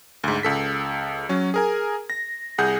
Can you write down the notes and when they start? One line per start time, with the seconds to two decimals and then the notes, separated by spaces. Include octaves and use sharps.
0.24 D2 G#2
0.43 C#2 A4 B6
1.29 F#3 C#4
1.54 G#4 A#4 G#5
2.10 A#6
2.58 C2 G#4 F#5 G6